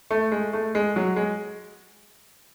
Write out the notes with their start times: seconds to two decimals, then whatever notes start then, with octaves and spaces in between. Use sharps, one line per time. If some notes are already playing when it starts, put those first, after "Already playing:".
0.11 A3
0.32 G#3
0.53 A3
0.75 G#3
0.96 F#3
1.16 G#3